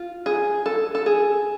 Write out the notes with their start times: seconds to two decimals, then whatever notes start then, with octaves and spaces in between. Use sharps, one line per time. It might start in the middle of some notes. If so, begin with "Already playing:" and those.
Already playing: F4
0.26 G#4
0.66 A4
0.95 A4
1.06 G#4